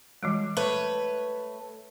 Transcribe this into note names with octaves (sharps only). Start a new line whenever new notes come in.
E3 G3 G#3
A3 B4 C#5